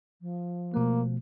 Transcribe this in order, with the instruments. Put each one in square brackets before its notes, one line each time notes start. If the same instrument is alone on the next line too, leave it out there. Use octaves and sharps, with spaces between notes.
[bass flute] F3
[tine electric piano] B2 A3 [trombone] A#3